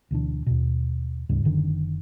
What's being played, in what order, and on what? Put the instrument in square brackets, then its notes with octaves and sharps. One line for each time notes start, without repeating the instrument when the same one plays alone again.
[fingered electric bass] D2 B2 E3 D4
D#2 B2
D2 G#2 C#3 G3
F#1 F#2 D3 D#3